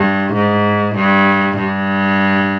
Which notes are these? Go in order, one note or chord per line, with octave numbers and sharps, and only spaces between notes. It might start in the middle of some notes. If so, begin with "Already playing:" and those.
Already playing: G2
G#2
G2
G2